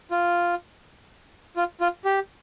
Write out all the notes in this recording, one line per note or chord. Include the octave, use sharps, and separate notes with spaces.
F4
F4
F4
G4